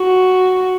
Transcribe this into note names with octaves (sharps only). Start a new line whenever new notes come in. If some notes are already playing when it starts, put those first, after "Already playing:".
Already playing: F#4